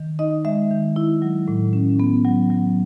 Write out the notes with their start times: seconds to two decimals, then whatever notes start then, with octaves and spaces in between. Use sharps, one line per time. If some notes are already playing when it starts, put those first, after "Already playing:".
Already playing: D#3
0.19 D#4 D#5
0.45 G#3 E5
0.71 D#3
0.96 E4
1.22 F#3
1.48 A2
1.73 C#4
2.00 B3
2.25 F#3
2.50 F#3